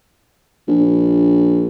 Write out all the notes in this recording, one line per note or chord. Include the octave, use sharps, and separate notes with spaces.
A#1